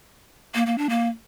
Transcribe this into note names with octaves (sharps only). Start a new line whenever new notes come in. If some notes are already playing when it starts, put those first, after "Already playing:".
A#3
A#3
D4
A#3